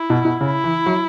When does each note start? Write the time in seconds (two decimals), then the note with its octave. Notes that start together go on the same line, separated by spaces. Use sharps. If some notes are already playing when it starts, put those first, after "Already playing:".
Already playing: E4
0.10 B2
0.25 B2
0.40 C#3 E4
0.64 E3
0.86 F#3